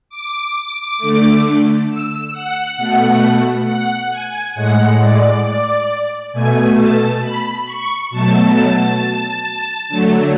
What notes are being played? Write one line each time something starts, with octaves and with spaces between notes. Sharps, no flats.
D6
D3 A3
E6
F#5
B2 A3
F#5
G#5
A2 G#3 F#5
D5
B2 A3 G#5
A5
B5
C#6
B2 F#3 A3 A5
D3 F#3 A3